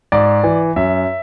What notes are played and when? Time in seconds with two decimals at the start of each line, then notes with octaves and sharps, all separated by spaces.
0.12 G#2 D5
0.44 E3
0.76 F#2 E5